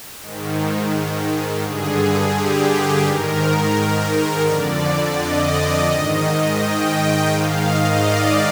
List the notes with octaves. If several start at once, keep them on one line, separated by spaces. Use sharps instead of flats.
G#2 D#3
G2 D3 G#4
G4
G#2 D#3 A#4
F2 D3 D5
D#5
G#2 D#3
G5
G#2 D#3 F5
D#5
D5